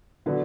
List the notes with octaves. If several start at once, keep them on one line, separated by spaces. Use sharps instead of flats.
D3 F#3 B3